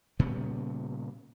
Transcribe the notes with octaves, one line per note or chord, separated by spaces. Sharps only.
A#2 C#3 G3 B3